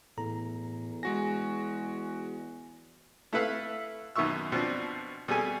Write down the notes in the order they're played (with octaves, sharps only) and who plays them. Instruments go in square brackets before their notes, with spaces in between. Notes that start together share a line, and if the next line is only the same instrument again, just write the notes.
[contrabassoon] E2 [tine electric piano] A2 A4 A#5
[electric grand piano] G#3 F#4 A#6 [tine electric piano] G#5
[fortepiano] A3 E4 A4 B4 E5 F5
F#2 B2 D#3 E5 C#6 E6
B2 F3 C4 D4
B2 G3 G#4 A4 G#5